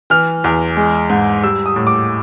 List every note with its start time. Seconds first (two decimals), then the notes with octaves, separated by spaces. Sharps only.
0.10 E3 F6
0.44 E2
0.76 G#3
1.10 G#2
1.43 G3 E6
1.66 D#6
1.76 A2
1.87 D6